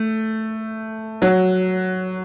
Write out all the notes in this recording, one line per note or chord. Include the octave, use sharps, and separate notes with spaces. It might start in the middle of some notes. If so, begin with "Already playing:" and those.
Already playing: A3
F#3